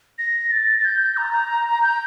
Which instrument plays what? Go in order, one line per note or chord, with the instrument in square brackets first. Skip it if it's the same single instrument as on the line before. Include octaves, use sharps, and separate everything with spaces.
[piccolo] A#6
A6
A6
G6
A#5
G6